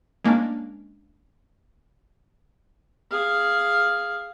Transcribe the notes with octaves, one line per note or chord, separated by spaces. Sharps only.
G#3 A#3 C#4 D4
G#4 F5